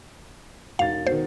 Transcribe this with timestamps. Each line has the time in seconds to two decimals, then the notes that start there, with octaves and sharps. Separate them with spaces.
0.79 E1 D#4 F5 A6
1.07 B2 D#3 C5